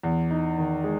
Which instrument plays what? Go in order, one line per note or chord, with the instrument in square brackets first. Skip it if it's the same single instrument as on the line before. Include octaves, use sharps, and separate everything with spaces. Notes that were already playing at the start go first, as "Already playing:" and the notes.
[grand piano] E2
D#4
D#3
G#3